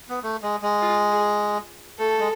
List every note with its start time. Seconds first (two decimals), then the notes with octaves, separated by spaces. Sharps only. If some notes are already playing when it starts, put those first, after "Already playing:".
0.09 B3
0.23 A3
0.43 G#3
0.62 G#3
0.82 F4
1.11 G#4
1.99 A3 A4
2.19 G#3